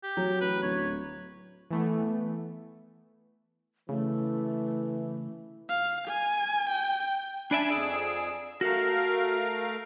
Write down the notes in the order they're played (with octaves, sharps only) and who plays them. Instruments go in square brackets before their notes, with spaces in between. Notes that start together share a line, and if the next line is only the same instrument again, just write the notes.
[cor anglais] G4
[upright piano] F#3
[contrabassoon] A1 [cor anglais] B4
[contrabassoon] D1 [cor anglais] C#5
[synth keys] E3 A3 B3
[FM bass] C#3 [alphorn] E3 [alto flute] A3
[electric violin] F5
G#5
G5
[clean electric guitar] D4 D5 E5 [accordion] G#5 A5 B5
[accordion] F2 G#4 E6 [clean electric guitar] D5
[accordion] A3 A#4 F5 [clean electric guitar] F#4